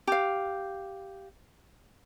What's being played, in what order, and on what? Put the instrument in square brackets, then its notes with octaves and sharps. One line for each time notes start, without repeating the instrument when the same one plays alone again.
[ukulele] G4 F5